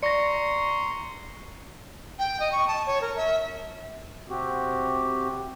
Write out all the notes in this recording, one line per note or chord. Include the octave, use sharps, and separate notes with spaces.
D5 A#5 C6 C#6 A#6 C#7
G5
D#5
C#6
A5
C#5
A#4
E5
C3 C4 F#4 G4